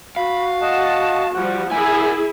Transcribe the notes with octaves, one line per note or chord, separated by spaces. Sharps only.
F#4 F5 B5
D#5 F#5 A5
F3 G3 F#5
E4 G#4 A#4 F#5 G#5 B5